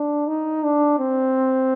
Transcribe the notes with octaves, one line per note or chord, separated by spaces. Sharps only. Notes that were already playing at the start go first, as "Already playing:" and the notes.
Already playing: D4
D#4
D4
C4